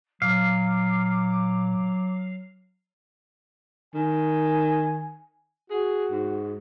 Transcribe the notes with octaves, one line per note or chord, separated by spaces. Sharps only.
A#2 F#3 F5 D6
D#3 G#5
F#4 G#4
G#2